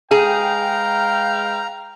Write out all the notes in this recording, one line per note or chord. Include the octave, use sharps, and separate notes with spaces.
G#3 G#4 B4 F5 G5 A#5